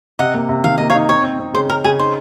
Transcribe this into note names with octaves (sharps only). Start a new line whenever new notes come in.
C3 D#5 F#5
A#3
C3
D#3 F5
A#3 D#5
C#5 F5
D#4
C4 C#5
C4
C4
C#3 C5
C#3 A#4
C#3 G#4
D#4 C5